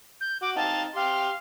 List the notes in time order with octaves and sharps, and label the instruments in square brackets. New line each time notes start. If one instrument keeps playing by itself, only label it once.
[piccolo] G6
[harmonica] F#4 [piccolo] D6
[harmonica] C4 D#4 F5 [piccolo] A5
[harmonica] G4 G5 C6 [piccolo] F5